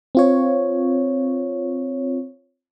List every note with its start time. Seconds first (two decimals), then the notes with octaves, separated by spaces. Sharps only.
0.15 C4 F4 C#5